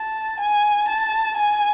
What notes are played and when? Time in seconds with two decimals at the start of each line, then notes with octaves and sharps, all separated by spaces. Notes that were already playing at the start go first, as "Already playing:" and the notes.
Already playing: A5
0.40 G#5
0.88 A5
1.37 G#5